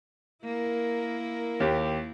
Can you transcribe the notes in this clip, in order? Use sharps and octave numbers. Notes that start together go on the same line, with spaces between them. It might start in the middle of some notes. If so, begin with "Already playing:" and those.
A#3 E4 A#4
D#2 G4